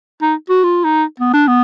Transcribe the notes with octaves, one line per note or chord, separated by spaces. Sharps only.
D#4
F#4
F4
D#4
B3
D4
B3